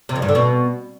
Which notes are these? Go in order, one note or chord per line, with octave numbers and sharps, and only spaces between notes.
C3
F2
G2
D3
B2